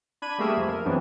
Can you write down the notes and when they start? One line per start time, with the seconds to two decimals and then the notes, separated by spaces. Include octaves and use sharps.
0.22 D4 B5 G#6 D#7
0.38 G3 A3 A#3 G#4 A#4 E5
0.57 F2
0.68 A#4
0.85 F#2 E3 F#3 B3 C4 D4